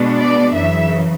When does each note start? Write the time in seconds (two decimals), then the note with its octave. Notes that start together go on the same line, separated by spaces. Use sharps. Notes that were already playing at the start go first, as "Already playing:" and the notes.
Already playing: B2 G#3 B3 D4
0.17 D5
0.53 F#2 C#3 E3 E5